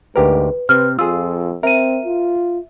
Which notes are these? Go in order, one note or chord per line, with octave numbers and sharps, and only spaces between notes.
D2 G#2 G4 A#4 B4
C3 C4 B4 F6
F2 F4 G#4 E6
C4 A#4 E5 D#7
F4